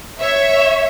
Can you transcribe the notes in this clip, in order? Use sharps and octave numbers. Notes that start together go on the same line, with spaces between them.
C#5 E5